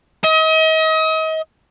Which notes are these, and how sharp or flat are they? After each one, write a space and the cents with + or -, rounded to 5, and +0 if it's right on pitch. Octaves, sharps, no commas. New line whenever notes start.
D#5 +35